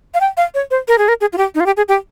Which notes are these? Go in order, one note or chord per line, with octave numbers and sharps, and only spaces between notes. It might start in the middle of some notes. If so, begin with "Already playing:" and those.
F5
G5
F5
C#5
C5
A#4
G#4
A#4
G#4
F4
G4
D#4
F4
G4
G#4
G4